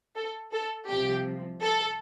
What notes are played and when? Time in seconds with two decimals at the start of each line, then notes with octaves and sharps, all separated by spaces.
0.16 A4
0.52 A4
0.88 C2 C3 F3 G4
1.62 A4